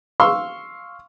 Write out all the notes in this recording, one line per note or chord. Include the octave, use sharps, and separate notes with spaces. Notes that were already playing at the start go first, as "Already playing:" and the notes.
F5 C6 C#6 E6